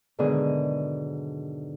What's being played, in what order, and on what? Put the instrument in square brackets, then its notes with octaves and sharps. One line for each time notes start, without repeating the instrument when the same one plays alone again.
[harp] G#2 B2 D3 D#3 F#3 G#4